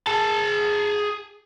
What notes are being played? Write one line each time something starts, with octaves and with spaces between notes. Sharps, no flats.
G#4 A5